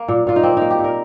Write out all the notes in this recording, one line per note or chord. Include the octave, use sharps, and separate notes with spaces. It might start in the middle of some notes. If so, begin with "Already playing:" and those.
Already playing: A#3
A#2
A#2 F4
D#4
A#3 C4
A#3 D#4
G4
A#2 A#4